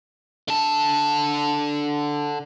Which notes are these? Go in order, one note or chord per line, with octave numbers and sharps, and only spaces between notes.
D3 A5